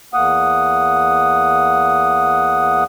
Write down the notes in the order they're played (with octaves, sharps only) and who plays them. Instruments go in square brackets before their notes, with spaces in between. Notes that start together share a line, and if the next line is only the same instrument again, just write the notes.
[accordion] E2 A#3 F#5 D#6